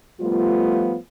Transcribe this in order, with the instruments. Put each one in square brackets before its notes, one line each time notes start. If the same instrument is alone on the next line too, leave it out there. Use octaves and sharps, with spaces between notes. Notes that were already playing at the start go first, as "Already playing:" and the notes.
[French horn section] F3 G3 A3 B3 F4